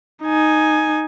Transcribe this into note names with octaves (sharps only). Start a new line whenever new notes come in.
D#4 G#5